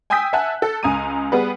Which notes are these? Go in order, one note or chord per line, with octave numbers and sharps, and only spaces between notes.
G5 G#5 D#6 E6 G6 B6
E5 F#5 G#5 A5 E6 F#6
A4
C#2 G#5 A#5 D#6 D#7
G3 B3 G#4 B4